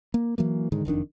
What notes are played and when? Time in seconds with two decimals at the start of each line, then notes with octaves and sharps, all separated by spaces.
0.14 A#3
0.38 E3 F#3 A#3
0.72 G#2 D3 D#3 G#3
0.85 F#1 F2 D#3 D4